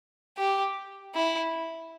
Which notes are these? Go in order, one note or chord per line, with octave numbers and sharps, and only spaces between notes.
G4
E4